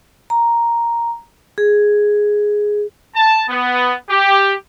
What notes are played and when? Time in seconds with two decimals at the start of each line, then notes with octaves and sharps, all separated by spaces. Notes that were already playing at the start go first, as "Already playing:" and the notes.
0.30 A#5
1.58 G#4
3.14 A5
3.48 B3
4.09 G4